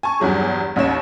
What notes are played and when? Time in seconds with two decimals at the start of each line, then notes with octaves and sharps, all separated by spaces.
0.03 G#5 A5 C#6
0.20 E2 G2 F#3 G#4
0.76 A1 D#2 C#5 E7